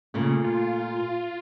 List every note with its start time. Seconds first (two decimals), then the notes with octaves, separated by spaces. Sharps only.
0.14 A#2 C#3 A3
0.44 F4